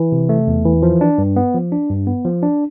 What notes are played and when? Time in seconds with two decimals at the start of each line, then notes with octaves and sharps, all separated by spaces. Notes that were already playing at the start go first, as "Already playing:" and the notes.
Already playing: E3
0.12 C3
0.29 A3
0.47 E2
0.65 E3
0.82 F3
1.01 D4
1.18 G2
1.36 B3
1.54 F3
1.72 D4
1.90 G2
2.07 B3
2.25 F3
2.43 D4